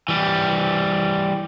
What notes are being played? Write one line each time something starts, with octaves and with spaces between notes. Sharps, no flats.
E3 G3